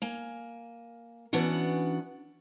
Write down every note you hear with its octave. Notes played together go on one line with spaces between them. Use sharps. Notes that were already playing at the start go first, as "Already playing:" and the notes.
A#3 G#5
E3 B3 C#4 D4 F#4